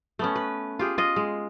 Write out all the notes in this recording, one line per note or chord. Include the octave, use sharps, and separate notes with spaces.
A3 B3 C#4
B4
F4 G4 G#4
F4 D#5
G#3